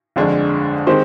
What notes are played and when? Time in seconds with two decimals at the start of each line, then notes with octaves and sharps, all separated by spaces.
0.16 G1 F2 D3 G#3 D4
0.87 D#3 G#3 C4 G4 C5